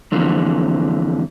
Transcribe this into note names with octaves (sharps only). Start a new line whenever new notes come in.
F2 D3 E3